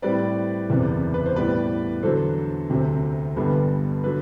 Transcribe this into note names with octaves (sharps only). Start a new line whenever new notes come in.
A2 G3 C4 B4 D5
F#1 E2 C3
B4
C5
A2 G3 B3 B4 D5
E2 D3 F#3 A4 C5
D2 C3 F#3 C4
G1 G2 D3 G3 B3
D3 F#3 B4